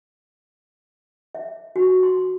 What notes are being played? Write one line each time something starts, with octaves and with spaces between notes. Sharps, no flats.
E5
F#4
C6